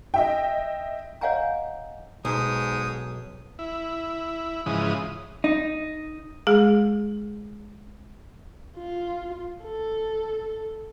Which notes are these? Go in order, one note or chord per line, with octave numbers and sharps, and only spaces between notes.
D#5 E5 G5
C#5 D#5 F5 F#5 G#5 A#5
B1 G#2 D#6
E4
G#2 C#3 E3 F3 D#6
D#4
G#3 G#4
F4
A4